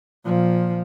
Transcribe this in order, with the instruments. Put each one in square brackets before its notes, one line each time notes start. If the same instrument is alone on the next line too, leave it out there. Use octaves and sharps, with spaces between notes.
[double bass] A#2 F3